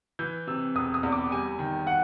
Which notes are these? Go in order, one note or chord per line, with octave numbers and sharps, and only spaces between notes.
E3 G6
C3 E6
E1 D#6
D#6
E2
D6
G3 G#5
D#3
F#5